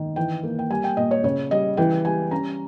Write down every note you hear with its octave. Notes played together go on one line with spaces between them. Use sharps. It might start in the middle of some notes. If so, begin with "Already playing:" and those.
Already playing: D#3
E3 G5
A#3
G5
G3 G#5
G5
A#2 D#5
C#5
C#3 C#5
G3 D#5
E3 G5
G3 G#5
C#4 A#5